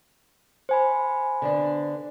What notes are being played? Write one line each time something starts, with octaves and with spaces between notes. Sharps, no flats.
C5 G#5 B5
D3 B3 D4